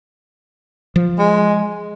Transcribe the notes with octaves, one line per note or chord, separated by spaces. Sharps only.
F3
G#3